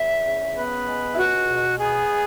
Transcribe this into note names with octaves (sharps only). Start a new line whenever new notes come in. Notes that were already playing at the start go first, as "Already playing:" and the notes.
Already playing: E2 E5
C#3
B3 B4
G#3
E4
C#2 F#4
B2
B3 G#4
G#3